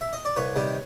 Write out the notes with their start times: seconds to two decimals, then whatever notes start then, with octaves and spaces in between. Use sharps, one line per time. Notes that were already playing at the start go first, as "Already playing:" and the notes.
0.01 E5
0.13 D#5
0.25 D5
0.36 C2 B4 C#5
0.56 C3 D#3 G3